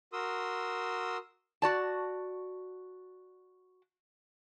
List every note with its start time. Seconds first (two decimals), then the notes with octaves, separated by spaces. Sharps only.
0.13 F#4 A#4 C6 D#6 E6
1.62 F#4 D5 A5